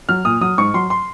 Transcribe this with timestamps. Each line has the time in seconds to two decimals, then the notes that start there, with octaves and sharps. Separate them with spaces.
0.09 F#3 F6
0.25 A#2 D#6
0.41 F#3 D#6
0.58 G#2 C#6
0.74 F#3 C6
0.90 C6